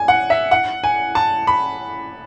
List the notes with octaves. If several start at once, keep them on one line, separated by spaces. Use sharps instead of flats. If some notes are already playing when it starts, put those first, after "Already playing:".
Already playing: G#5
F#5
E5
F#5
G#5
A5
B5